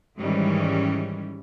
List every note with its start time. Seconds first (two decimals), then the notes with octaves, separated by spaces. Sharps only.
0.18 G#2 D#3 E3 G3 C#4